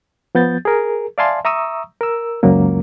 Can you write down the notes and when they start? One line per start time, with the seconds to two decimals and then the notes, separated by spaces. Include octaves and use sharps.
0.35 F3 B3 G6 A6
0.65 G#4 A#4
1.18 D5 E5 F5 G#5 A5 C6
1.45 E5 A#5 C#6 D#6 E6
2.01 A#4 E6
2.43 C#2 F#2 F#3 A#3